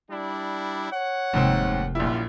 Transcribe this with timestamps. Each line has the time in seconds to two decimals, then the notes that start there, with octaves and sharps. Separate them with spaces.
0.10 G3 D4 E4
0.92 C#5 F#5
1.33 F1 D#2 G#2 C3 C4
1.95 A#1 F#2 G3 E4 F4